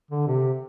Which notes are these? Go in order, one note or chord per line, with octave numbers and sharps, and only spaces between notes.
D3
C3